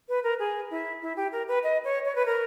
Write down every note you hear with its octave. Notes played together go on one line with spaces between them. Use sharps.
B4
A#4
G#4
E4
E4
G4
A#4
B4
D#5
C#5
C#5
B4
A#4